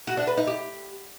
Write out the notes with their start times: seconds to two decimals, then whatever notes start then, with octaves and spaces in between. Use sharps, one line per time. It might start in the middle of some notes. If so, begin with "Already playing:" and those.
0.07 F#4
0.17 D4
0.27 B4
0.37 D#4
0.47 G4